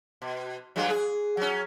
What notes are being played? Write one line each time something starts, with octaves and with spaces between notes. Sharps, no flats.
B2
G2 F#3 G#3
G#4
F#3 C#4